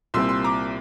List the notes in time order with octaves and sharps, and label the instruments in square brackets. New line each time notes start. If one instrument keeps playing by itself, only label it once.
[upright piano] C2 A#2 G3 C4 C6 E6
C6 E6
A#5 D6